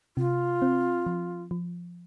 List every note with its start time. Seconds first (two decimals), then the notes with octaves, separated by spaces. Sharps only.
0.17 C3 F4
0.62 C4
1.06 F3
1.51 F3